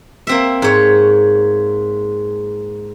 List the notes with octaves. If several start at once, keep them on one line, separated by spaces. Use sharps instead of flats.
A#3 C4 E5
G#2 C#5